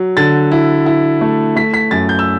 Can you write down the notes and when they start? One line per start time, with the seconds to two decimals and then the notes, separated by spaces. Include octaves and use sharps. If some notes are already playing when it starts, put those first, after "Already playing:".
Already playing: F#3
0.17 D3 A6
0.52 E4
0.86 E4
1.21 A3
1.56 A3 B6
1.74 B6
1.91 F#2 A6
2.09 G6
2.19 E6